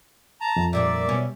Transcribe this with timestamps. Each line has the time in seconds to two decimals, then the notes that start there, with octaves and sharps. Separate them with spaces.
0.41 A5 A#5
0.56 F2
0.73 A#2 G3 D4 D5 E5
1.09 B2 G3 C#4